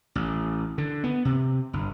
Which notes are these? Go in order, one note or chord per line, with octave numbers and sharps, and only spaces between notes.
A1
D3
B3
C3
G1